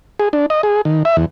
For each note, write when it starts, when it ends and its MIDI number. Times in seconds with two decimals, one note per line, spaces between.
0.20 0.29 68
0.33 0.46 62
0.50 0.61 75
0.63 0.81 68
0.85 1.03 51
1.05 1.16 76
1.17 1.25 40